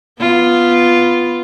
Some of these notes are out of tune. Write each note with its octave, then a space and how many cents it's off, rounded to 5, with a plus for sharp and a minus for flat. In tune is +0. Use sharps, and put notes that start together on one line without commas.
B3 +0 F4 -5